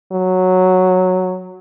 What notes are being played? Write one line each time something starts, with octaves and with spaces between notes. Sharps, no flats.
F#3